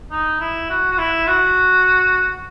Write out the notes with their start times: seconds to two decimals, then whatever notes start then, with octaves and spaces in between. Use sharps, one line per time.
0.11 D#4
0.40 E4
0.70 F#4
0.91 F#4
0.98 E4
1.27 F#4